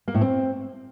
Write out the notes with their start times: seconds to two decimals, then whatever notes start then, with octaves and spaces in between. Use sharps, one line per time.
0.08 A#3
0.14 A2
0.21 C4